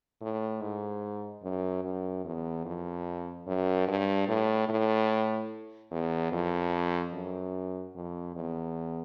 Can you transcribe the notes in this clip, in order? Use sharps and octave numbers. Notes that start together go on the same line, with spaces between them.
A2
G#2
F#2
F#2
E2
F2
F#2
G2
A2
A2
E2
F2
F#2
F2
E2